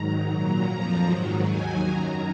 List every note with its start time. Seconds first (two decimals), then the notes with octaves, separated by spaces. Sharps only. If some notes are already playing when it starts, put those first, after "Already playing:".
Already playing: G#2 D#3 F#3 A#5
0.28 A#2 F#3
0.67 F2 F3 A#5
1.05 G#2 D#3 F#3
1.45 D#2 D#3 F#3 G#5
1.84 F#2 D#3 F#3 A#5